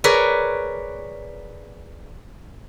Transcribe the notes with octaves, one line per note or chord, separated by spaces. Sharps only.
G#4 A#4 B4 C#5 D5